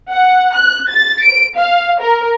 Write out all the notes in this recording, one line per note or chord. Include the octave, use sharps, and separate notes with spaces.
F#5
F#6
A6
D7
F5
A#4